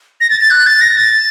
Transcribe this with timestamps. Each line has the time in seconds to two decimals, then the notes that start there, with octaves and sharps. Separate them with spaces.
0.21 A#6
0.30 A6
0.41 A6
0.50 F#6
0.66 A6
0.81 A#6
0.97 A6